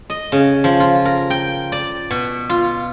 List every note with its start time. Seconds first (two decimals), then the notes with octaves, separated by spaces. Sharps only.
0.10 D#5
0.32 C#3
0.64 F3
0.80 F4
1.05 A#4
1.30 G5
1.72 D5
2.11 B2
2.49 F4